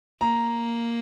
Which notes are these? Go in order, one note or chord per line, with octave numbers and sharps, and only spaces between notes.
A#3 A#5